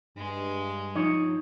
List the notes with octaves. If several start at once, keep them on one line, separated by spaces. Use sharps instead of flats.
G2 G#3
F3 D#4 C#5